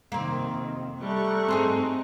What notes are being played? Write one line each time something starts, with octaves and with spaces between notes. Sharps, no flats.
F2 C3 D#3 A#3 C4
G3 A3 A#5 C#6 F#6
C4 D#4 G#4 C5